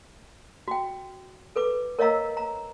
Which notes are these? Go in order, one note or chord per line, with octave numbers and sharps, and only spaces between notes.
F#4 G5
A4 B4 D6
A#4 C#5 D#5 F5 A#5 E6
A#5